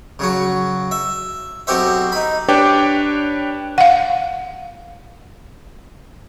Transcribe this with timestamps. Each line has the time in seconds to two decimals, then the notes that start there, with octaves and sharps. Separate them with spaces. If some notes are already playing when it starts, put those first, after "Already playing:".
0.19 C#3 F#3 F#4
0.91 E5
1.67 B1 C4 F#4 G4 C5 E5
2.12 D#4 B5
2.48 D4 G4 B4 C#5 G5 D6
3.78 F5 F#5